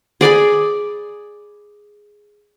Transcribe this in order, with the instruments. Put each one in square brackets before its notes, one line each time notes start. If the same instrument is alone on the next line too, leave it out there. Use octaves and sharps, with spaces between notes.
[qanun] G#4 D5 G#5 B5